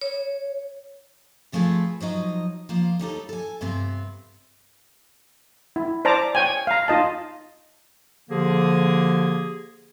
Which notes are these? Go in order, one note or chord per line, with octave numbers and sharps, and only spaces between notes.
C#5
C3 F3 A3 C4 G#4 B4
F3 F#3 D#4 D#5
F3 A#3 C5
D#2 G3 D#4 A4
A4 G#5
G2 C3 B3 C4
E4
C5 D5 A5 A#5 D6
C#5 G5 G#5
F5 A#5
D#4 F4 D#5 A5
D3 F3 A#3 G4 G#4